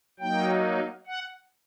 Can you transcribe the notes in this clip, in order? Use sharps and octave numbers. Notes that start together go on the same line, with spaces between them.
F#3 A#3 D#4 G5
F#5